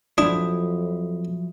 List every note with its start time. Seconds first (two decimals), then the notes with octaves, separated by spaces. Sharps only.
0.18 F2 F3 F#3 D4 E4 D#6